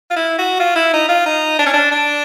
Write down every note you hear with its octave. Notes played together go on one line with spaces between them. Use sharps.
F4
E4
F#4
F4
E4
D#4
F4
D#4
D4
C#4
D4
D4